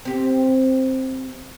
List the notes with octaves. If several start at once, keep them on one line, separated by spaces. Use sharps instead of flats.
C4 G4